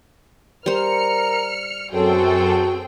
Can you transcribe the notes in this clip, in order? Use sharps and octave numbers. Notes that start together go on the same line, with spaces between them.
G3 A#4 C5 F6 C#7
F#2 C4 F#4 G#4 A4 G5